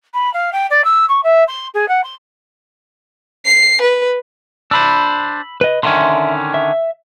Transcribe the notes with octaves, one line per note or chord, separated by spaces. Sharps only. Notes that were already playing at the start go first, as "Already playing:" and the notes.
B5
F5
G5
D5
E6
C#6
E5
C6
G#4
F#5
C6
C7
B4
D4 C5 B5 E6
B4 D#5
D3 D#3 C#4 E5 C6
E5